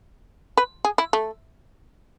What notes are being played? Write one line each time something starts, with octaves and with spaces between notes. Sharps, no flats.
B4
G#4
E4
A3